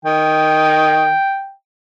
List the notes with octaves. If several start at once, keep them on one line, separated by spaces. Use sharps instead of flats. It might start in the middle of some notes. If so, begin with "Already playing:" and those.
D#3 G5